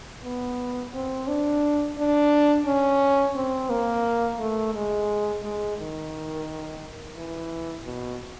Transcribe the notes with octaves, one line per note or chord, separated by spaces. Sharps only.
B3
C4
D4
D4
C#4
C4
A#3
A3
G#3
G#3
D#3
E3
B2